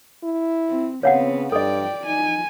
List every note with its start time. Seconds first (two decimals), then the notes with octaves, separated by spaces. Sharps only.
0.24 E4
0.69 C4
1.03 C#3 B3 C4 C#5 F5 F#5
1.52 G2 A4 D5 D#5 G5
2.06 D#4 G#5